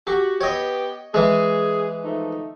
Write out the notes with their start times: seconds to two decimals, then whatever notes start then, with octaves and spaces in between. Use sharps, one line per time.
0.07 F#4 G4
0.41 B3 G4 C#5 D#5
1.14 E3 G#3 G#4
2.03 F3 A3 D#4